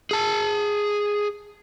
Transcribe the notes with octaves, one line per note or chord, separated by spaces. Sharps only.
G#4 A5